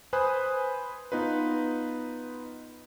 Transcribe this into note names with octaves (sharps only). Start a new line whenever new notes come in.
B4 C5 G#5 B5 D#6 F#6
B3 D#4 F4 B4